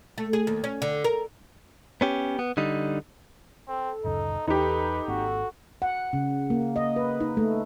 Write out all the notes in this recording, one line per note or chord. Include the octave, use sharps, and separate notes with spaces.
A3
G#4
D#2
C#4
D3
A#4
B3 C#4 G4
B3
D3 G3 D#4
C4 A4
D1 F#2 C#3 D#4
E2 E3 D#4 G4 B4
G#1 A#3 C4 F#4
F#5
C#3
A#3
D#5
B4
D#4
A3